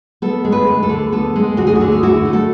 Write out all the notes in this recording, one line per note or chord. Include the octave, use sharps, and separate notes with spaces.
B3 A4
G#3
B4
D2
A4
D3
B3 A4
G#3
D2 F#4
G#4
F#4
D3
G#4
E4 F#4
A3
A4